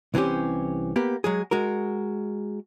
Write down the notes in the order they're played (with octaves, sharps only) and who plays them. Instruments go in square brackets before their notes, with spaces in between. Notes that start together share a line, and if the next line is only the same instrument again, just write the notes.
[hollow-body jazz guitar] C2 E3 C4 C#4 G4
A#3 B3 G4
F#3 G#3 G#4
G#3 F#4 A#4